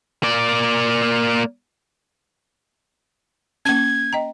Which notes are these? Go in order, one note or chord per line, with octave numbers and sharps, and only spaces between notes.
A#3 D5
A#3 C#4 G#6
D#5 G5 A#5